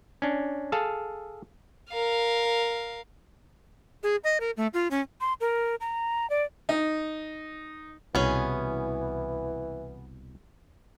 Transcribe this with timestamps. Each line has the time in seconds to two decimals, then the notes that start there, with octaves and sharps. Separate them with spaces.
0.22 C#4 D4
0.72 G#4 A4 F5 A5
1.90 A#4 F5
4.03 G#4
4.24 D#5
4.40 A#4
4.57 A3
4.74 F4
4.91 C#4
5.21 C6
5.41 A#4
5.81 A#5
6.30 D5
6.69 D#4
8.15 C2 B2 E3 B3 C#4 G#4